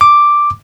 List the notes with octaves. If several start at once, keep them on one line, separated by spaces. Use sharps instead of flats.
D6